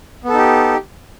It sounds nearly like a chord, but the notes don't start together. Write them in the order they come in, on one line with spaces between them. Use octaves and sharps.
B3 A4 D#4 G4